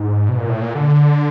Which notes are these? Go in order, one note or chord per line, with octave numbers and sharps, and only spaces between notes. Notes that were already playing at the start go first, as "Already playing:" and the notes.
Already playing: G#2
B2
A#2
A2
A#2
D3